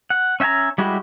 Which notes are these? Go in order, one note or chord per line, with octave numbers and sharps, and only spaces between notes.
F#5
C#4 E5 G5 G#5 A#5
G3 G#3 E4 F#4 G4